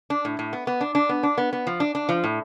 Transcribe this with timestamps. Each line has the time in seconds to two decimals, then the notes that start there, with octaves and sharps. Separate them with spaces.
0.10 D4
0.25 A2
0.39 A2
0.53 B3
0.67 B3
0.81 D4
0.95 D4
1.09 B3
1.23 D4
1.38 B3
1.53 B3
1.67 F3
1.80 D4
1.95 D4
2.09 F3
2.24 A2